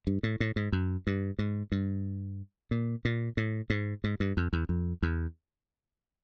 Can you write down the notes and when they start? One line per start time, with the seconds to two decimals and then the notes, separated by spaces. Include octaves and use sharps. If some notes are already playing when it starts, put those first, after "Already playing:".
0.07 G2
0.23 A2
0.40 A2
0.56 G#2
0.72 F#2
1.07 G2
1.39 G#2
1.72 G2
2.71 A#2
3.05 A#2
3.37 A2
3.70 G#2
4.04 G#2
4.20 G2
4.37 F2
4.53 E2
4.69 F2
5.03 E2